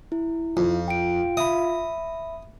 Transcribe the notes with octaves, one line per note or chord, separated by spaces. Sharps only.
E4
F2 F4
G5 D7
E5 B5 D#6